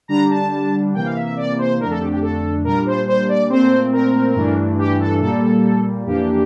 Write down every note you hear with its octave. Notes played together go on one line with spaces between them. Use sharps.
D3 G3 D4 A#5
A5
C3 E3 A#3 G5
F5
E5
E5
D5
C5
F2 D3 A3 D4 A#4
A4
G4
G4
A4
A#2 G3 D4 A#4
C5
C5
D5
A#2 A3 C4 C5
A#4
G2 E3 A3 D4
G4
A4
A#2 G3 A#3 A4
F2 E3 A#3 D4 G4